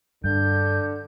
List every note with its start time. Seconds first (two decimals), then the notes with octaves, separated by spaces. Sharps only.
0.24 G2 D3 G6